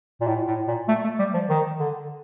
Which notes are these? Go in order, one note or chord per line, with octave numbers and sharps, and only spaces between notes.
A#2
A2
A2
A#2
A3
A3
G3
F3
D#3
D3